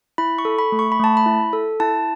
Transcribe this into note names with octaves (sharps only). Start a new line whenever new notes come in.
E4 B5
C#6
A4
B5
A3
C#6
B5
A3 A5
B5
E4
A4
E4 A5